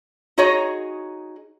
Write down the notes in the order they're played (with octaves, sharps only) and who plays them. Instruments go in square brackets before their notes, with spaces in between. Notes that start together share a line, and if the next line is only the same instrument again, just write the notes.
[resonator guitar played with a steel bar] D#4 F#4 G#4 C#5 D#5